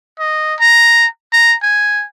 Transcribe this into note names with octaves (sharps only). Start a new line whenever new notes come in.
D#5
A#5
A#5
G#5